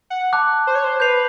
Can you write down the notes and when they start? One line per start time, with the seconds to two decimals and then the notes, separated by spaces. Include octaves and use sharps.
0.10 F#5
0.33 A5 D6 F#6
0.67 C5
0.75 C#5
0.84 C5
1.00 B4 G6 C7 F7